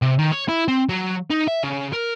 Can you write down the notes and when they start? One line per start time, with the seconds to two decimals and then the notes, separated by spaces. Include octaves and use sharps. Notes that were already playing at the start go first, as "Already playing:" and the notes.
0.02 C3
0.19 D#3
0.32 C#5
0.48 E4
0.68 C4
0.89 F#3
1.31 D#4
1.48 E5
1.64 C#3
1.93 A#4